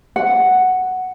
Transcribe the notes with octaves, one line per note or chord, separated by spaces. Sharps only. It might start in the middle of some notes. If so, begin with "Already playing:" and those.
F#5